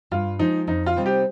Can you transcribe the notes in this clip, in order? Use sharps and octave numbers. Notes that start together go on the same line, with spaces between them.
G2 F4
F3 G#3 D#4
F2 D#4
F4
C3 G3 C4 D#4
G4